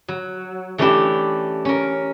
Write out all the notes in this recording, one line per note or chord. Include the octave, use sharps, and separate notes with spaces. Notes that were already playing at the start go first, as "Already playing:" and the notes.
F#3
E3 A3 C#4 D4 E4 G4
C#4 A#4